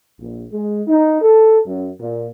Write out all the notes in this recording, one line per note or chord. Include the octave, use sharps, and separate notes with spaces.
A#1
G#3
D#4
A4
F#2
A#2